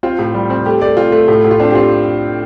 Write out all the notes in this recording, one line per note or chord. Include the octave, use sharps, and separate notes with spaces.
C4 F4
A2
G3
C4
A3 G4
A3 D5
C4 F4
A3
A2
A2
F4
C4 D4
G4
C4 F4